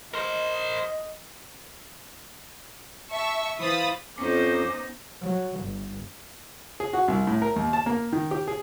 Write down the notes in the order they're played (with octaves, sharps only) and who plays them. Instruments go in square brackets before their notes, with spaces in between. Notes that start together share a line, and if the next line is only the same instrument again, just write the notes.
[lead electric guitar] A#4 C5 [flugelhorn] D#5
[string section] E5 A5 C#6
E3 C5 F5 B5 D#6 A6
[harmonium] F2 [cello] B3 D#4 [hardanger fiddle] C#4 C5 [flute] D6
[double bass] F#3
G1
[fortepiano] G#4
F#4
C2
A2
A#4
D#2
A5
A#3
D#3
G4
G#4